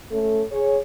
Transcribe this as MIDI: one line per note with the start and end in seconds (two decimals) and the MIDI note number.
0.10 0.43 57
0.10 0.43 61
0.10 0.43 69
0.52 0.78 68
0.52 0.78 73